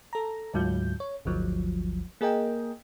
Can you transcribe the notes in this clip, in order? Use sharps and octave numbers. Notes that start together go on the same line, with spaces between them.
A4 A#5
D2 G#2 F#3 F4 G6
C#5
G1 D2 F3 F#3
A#3 G#4 A#4 D#5 G5